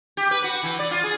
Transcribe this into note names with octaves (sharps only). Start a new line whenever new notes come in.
G4
B4
F#4
E3
D5
F4
G#4